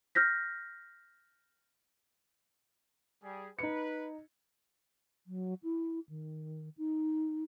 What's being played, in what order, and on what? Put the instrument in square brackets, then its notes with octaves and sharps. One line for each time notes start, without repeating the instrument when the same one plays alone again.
[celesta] F6 G6 A#6 B6
[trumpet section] G3 G#4
[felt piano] D#4 C#7 [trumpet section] B4
[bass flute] F#3
E4
D#3
D#4